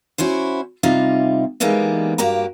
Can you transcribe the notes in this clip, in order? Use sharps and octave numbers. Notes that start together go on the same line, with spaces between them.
C#4 E4 F#4 C5
C3 G3 D#4 F4
E3 G3 G#3 A#3 B3 D#4
G2 A#3 F#4 G4 A#5